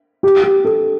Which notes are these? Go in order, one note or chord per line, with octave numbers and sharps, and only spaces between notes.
G4
G4
A4